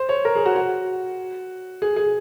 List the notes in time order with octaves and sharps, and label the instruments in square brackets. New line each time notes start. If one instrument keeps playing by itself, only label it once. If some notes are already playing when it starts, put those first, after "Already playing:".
Already playing: [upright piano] C5
C#5
A#4
G#4
F#4
F#4
G#4
G#4